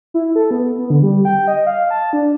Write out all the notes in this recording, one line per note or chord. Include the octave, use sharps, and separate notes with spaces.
E4
A4
B3
B3
D3
G3
G5
D#5
F5
A5
D4